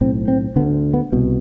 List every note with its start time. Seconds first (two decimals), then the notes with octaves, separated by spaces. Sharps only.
0.01 B1 A2 C4
0.28 C4
0.56 D3 B3
0.59 D2
0.94 B3
1.12 C2 B2